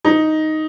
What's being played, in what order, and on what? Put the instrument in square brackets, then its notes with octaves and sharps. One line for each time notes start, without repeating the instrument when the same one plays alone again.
[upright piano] D#4